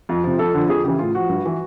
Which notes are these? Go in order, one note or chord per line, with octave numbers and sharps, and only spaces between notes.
F2
C3 F3
F2 A4
D3 F3
F2 G#4
C#3 E3 G4
A2 F4
F3 F#4
G2
E3